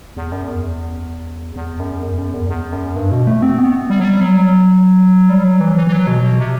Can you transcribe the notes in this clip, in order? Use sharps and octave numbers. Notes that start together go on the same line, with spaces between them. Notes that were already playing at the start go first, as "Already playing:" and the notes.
E2
F#2
E2
E2
F#2
E2
F#2
E2
E2
F#2
G2
B2
A3
C4
B3
G3
F#3
G3
F#3
G3
F#3
E3
E3
E3
F#3
B2
B2
C3